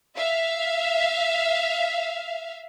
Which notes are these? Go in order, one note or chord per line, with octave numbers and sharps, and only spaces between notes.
E5 F5